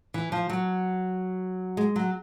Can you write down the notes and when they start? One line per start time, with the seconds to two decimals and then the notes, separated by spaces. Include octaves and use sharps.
0.14 E3
0.32 F3
0.50 F#3
1.77 G#3
1.96 F#3